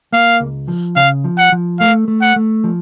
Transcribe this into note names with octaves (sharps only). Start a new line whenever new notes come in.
A#3 F5
C#2
F3
C#3 F5
F3
F#5
F3
A3 F5
A3
F#5
A3
F3